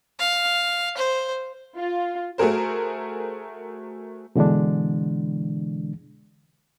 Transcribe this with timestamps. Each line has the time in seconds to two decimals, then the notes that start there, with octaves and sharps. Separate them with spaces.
0.19 F5
0.97 C5
1.76 F4
2.38 A3 F#4 G#4 A#4 C5
4.36 B2 D3 E3 G#3 D4